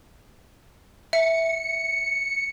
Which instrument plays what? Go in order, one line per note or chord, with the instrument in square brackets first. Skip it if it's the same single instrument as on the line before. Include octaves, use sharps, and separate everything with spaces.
[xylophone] E5 [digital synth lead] C#7